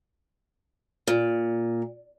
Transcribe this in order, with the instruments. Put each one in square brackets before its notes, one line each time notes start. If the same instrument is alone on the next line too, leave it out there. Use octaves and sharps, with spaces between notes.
[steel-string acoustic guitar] A#2